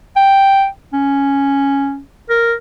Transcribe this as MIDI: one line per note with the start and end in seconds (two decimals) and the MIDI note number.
0.16 0.66 79
0.93 2.00 61
2.30 2.54 70